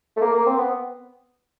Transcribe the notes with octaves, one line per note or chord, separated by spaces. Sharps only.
A3
A#3
A#3
C4
B3